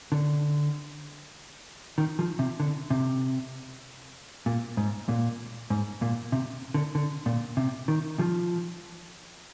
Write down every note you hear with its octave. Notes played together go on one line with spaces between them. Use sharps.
D3
D#3
F3
C3
D3
C3
A#2
G#2
A#2
G#2
A#2
C3
D3
D3
A#2
C3
D#3
F3